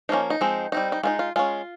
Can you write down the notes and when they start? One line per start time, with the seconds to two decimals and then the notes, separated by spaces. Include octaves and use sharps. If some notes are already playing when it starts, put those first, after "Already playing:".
0.09 F3 A#3 C#4 D#4
0.30 D#4
0.41 F3 G#3 C4
0.72 G3 C4 D#4
0.92 D#4
1.03 G#3 C4 D#4 F4
1.19 F4
1.36 G#3 C#4 F4